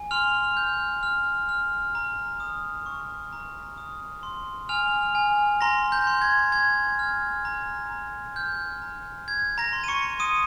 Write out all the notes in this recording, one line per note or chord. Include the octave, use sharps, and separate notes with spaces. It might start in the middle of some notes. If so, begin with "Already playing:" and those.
Already playing: G#5
C6 F6 F7
G6
F6
F6
A#5
D#6
C#6
A#5
D#6
C6
G#5 F6 F7
G#5
A#5 C6 A#6
G6
C6
G#6
C6 G#6
F6
A#5
A#5
F6 G6
A#5
G6 G#6
A#5 A#6
C6
D#7
C#6 C#7
C6 D#6 D#7